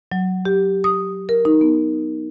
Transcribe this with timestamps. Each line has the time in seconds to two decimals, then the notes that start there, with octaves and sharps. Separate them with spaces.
0.12 F#3
0.45 G4
0.84 D#6
1.29 A#4
1.45 D#4
1.61 B3